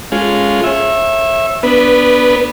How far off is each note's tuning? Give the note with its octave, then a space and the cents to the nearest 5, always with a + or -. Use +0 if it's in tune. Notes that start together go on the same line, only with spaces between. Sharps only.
G#3 +0 C#4 +0 F4 +0
C#5 -40 E5 +0
B3 +0 D4 +0 B4 -20